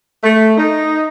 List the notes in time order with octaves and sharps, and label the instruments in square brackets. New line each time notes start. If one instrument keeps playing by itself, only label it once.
[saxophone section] A3
D#4